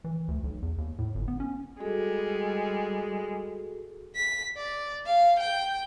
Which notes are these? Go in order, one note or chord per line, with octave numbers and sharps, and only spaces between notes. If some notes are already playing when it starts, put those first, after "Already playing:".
E3
D2
B1
E2
D#2
A2
G1
B3
C#4
G3 G#3 F#4 G#4 A4
B6
D5
F5
G5